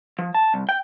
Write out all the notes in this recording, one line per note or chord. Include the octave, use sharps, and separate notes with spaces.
F3
A5
C2
G5